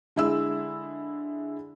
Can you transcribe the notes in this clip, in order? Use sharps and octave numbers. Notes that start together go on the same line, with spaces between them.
D3 G#3 E4 G#4 E6